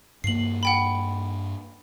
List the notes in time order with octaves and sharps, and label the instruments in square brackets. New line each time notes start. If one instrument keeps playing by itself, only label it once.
[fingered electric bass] G2 A#3 [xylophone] C7 F#7
[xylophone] F#5 G5 B5